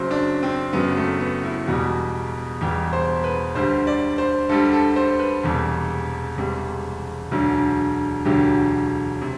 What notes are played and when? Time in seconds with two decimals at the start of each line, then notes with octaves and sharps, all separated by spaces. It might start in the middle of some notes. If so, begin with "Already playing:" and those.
Already playing: F#1 F#2 F#3 C5
0.11 D4
0.43 C4
0.73 F#1 F#2 F#3 B3
0.97 A3
1.20 B3
1.44 E4
1.67 E1 E2 B2 G3 F#4
2.61 E1 E2 B2 G3 G4
2.93 C5
3.24 B4
3.55 D2 D3 G3 C5
3.87 D5
4.18 C5
4.49 D2 D3 G3 A4
4.73 A4
4.96 C5
5.20 B4
5.43 E1 E2 C3 G3 A4
6.37 E1 E2 C3 G3
7.31 E1 D2 D3 F#3
8.25 E1 D2 D3 F#3 G4
9.22 C3